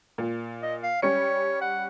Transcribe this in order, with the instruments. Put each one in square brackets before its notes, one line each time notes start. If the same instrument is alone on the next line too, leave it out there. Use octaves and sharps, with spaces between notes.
[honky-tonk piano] A#2
[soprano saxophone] D#5
F5
[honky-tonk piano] G3 C#4 C#7 [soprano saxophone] C#5
[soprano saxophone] F#5